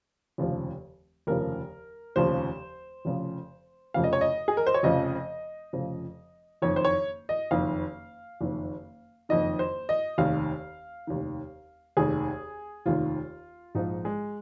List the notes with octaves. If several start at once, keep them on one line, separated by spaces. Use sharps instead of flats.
F1 D#2 C#3 F3
F1 D#2 C#3 F3 A#4
F1 D#2 C#3 F3 C5
F1 F2 C#3 F3
F1 F2 C#3 F3 F5
D#5
C#5
D#5
G#4
A#4
C5
C#5
F1 F2 C#3 F3 D#5
F1 F2 C#3 F3
F#1 F2 D#3 C#5
C5
C#5
D#5
F#1 F2 D#3 F5
F#1 F2 D#3
F#1 F2 D#3 D#5
C5
D#5
F1 D#2 D#3 F5
F1 D#2 D#3
F1 D#2 D#3 G#4
F1 D#2 D#3 F4
A#1 G#2 F3 D#4
G#3